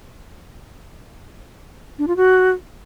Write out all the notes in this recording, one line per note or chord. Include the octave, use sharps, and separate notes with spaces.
D4
F4
F#4